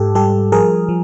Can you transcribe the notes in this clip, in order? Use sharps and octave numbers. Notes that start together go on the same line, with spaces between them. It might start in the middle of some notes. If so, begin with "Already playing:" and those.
Already playing: G#2 G4 A4
G3 G4 A4
F3 G#4 A#4
F3